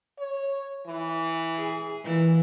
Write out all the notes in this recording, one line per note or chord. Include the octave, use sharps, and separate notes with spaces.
C#5
E3
G#4
A#2 E3